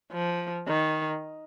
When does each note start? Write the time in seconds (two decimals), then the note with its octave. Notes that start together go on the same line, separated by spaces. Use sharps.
0.12 F3
0.68 D#3